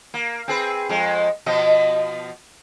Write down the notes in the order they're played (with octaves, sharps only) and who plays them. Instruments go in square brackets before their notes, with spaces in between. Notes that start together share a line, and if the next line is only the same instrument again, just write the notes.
[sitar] A#3
C4 G#4 B4
F2 G#3
B2 F3 D#5